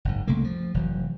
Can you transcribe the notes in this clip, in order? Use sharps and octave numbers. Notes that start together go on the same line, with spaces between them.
F#1 G#2
C2 C#3 A3 A#3
F3
F1 E3 F#3